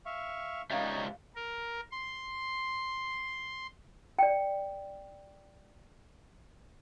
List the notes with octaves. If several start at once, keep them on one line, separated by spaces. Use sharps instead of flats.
E5 F5 C#6
C#2 G3 D#4 C#5 E5 F5
A#4
C6
D5 G5